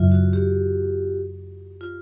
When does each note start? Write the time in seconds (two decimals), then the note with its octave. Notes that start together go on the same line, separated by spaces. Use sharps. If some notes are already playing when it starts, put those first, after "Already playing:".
Already playing: F#2 C#3 F#3 F4
0.12 F#4
0.33 G4
1.81 F4